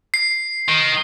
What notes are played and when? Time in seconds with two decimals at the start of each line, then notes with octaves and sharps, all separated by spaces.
0.14 C7
0.68 D#3